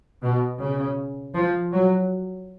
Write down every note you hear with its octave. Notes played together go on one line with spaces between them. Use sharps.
B2
C#3
F3
F#3